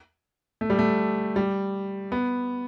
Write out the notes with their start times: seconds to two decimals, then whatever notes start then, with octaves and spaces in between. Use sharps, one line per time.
0.61 A3
0.70 G3
0.79 A3
1.36 G3
2.12 B3